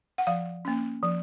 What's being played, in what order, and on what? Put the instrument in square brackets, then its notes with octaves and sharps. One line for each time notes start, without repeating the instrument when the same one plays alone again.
[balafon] F#5
F3 F5
A#3 C#4
F3